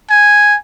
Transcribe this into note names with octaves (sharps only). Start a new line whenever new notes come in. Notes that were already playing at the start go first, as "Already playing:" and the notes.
G#5